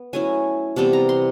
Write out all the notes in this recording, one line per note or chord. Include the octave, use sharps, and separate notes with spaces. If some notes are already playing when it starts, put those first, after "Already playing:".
Already playing: B3
F#3 A3 C#4 E4 G#5
C3 E3 G3 B3 A5
A#5
C6